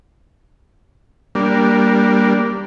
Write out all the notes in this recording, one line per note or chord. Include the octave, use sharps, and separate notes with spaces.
G3 A#3 D4